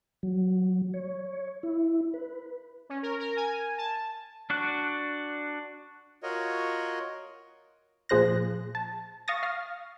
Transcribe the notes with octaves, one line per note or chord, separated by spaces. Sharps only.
F#3
C#5
E4
B4
C#4
A#4
A#4
G#5
A5
D4 F#4 F#6
F4 F#4 A#4 C#5 D#5
A#2 F3 G#4 C5 F#6 A#6
A5
F5 C#6 D#6 A6 A#6
F5 F6